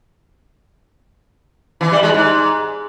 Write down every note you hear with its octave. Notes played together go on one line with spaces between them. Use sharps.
E3
G3
G#3
G#2